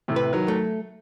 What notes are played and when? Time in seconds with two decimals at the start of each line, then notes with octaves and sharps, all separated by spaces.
0.08 A2 C3
0.16 B4
0.32 D#3 F#3
0.48 A3